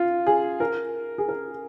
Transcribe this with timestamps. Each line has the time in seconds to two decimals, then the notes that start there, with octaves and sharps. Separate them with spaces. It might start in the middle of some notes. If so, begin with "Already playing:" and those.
Already playing: F4
0.27 G#4
0.60 A#4
1.18 G#4
1.29 A#4